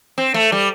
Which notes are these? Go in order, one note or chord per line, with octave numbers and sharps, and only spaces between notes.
C4
A3
G3